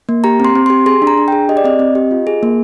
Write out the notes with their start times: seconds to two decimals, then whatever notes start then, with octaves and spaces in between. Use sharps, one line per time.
0.09 A#3
0.24 G4 A#5
0.40 C4 C6
0.55 C4
0.66 G4 C6
0.86 G#4 C6
1.02 D4
1.07 A#5
1.18 D4
1.28 G#4 G5
1.49 G4 D#5
1.57 D5
1.64 C4 D#5
1.79 C4
1.95 G4
2.11 F4
2.27 G#4
2.43 A#3